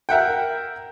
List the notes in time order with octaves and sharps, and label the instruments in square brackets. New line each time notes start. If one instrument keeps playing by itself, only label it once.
[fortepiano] A#4 E5 F#5 G5